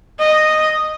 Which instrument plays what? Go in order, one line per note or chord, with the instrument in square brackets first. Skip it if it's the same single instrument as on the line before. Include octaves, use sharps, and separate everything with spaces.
[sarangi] D#5